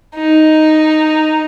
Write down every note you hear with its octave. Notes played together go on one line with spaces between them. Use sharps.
D#4